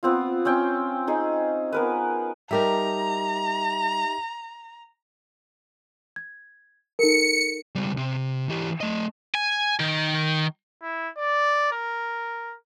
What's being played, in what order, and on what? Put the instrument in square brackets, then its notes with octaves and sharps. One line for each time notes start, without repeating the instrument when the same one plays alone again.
[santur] B3 C4 F4
C4 C#4 G5 C#6
D#4 G#4
B3 A#4 B4
[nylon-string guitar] G3 A#4 A5 [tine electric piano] D#4 G4 E5 [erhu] A#5
[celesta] G#6
[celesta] D#4 A4 A#4 [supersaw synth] C#7
[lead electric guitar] C#2 G3
C3
E3 G4
A3 D#5
[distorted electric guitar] G#5
D#3
[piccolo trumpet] E4
D5
A#4